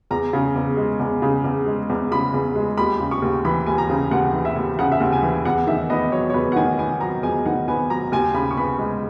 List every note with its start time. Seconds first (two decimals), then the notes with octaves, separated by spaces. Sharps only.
0.11 E2 A#5
0.33 C#3
0.55 E2
0.77 G#3
1.00 E2
1.22 C#3
1.44 E2
1.66 G#3
1.90 E2
2.11 C#3 B5
2.34 E2
2.55 G#3
2.77 D#2 B5
3.00 C#3
3.11 C#6
3.22 D#2
3.45 E3 B5
3.66 D#2 G#5
3.78 A#5
3.90 C#3
4.11 D#2 F#5
4.33 E3
4.45 E5
4.56 D#2
4.79 C#3 F#5
4.92 E5
5.00 D#2 F#5
5.12 G#5
5.22 E3
5.45 E2 F#5
5.67 D#3 E5
5.90 B3 D#5
6.12 F#3 C#5
6.30 C#5
6.34 E2 B4
6.52 F#5
6.56 D#3 G#5
6.79 B3 G#5
7.01 F#3 A#5
7.23 E2 G#5
7.46 D#3 F#5
7.68 B3 G#5
7.90 F#3 A#5
8.12 D#2 G#5
8.34 C#3 B5
8.51 C#6
8.57 B3 B5
8.79 G#3